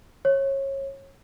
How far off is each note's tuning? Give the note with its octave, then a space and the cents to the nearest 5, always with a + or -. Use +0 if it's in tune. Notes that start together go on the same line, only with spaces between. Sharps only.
C#5 -25